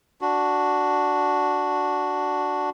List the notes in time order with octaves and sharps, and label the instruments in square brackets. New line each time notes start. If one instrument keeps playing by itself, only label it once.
[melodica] D4 F#4